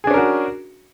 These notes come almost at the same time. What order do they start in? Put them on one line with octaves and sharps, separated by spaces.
G#4 D4 C#4 A#4 F#4